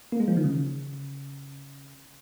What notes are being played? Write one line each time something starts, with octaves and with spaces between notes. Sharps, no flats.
A#3
G#3
F3
D#3
C#3